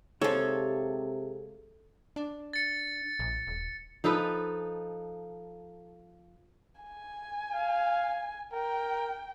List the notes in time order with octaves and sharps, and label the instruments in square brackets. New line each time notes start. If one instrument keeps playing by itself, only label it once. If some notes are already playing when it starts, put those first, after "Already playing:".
[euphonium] C3 [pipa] F3 C#5 [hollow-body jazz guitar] G#3 D#4 G4 [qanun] A4
[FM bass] D4
[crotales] A6 C#7
[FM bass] A#1
D#1
[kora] F3 D#4 A4 B4
[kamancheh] G#5
[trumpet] F5
[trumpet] A#4 [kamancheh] G5